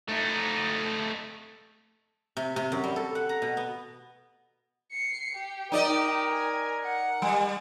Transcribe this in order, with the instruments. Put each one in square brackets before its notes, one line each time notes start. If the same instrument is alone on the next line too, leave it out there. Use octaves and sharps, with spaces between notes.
[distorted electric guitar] A3 D#4
[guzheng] C3
C3
F#2
G3
A4
F#5
A#5
B2
B3
[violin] C7 C#7
G4
[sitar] D#4 D5 D#5 [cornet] A#4
[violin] G#5
F#5
[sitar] G3